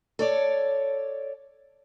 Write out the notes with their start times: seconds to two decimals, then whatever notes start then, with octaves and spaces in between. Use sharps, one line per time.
0.19 A4 C#5 D5